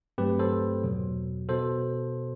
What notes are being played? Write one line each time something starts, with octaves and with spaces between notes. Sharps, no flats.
G2 F#3 A3 C4 G4 B4
A4 C5
E2 B2 F#3
B2 A4 C5